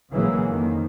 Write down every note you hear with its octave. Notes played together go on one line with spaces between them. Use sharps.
A#1 C#3 E3 F#3 G#3 A#3
F2 D#3 A#3